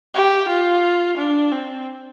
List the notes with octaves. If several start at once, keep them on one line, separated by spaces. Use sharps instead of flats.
G4
F4
D4
C4